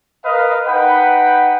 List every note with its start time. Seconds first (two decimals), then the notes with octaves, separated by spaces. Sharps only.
0.25 A#4 B4 D#5 F5
0.66 D#4 B4 F#5 G5 B5